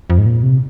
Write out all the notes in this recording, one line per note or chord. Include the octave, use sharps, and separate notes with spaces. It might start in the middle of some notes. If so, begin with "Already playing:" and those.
F2
G#2
A#2
C3